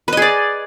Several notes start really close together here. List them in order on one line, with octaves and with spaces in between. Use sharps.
B4 D#5 G#4 D5